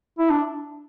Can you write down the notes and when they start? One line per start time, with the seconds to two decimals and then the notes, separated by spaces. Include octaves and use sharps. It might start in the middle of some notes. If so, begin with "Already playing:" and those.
0.19 E4
0.30 D4